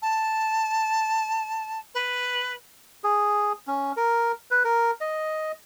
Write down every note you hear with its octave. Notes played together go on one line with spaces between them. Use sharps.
A5
B4
G#4
C#4
A#4
B4
A#4
D#5